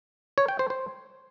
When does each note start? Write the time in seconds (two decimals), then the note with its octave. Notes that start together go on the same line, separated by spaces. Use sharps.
0.38 C#5
0.48 G5
0.59 C5
0.70 C5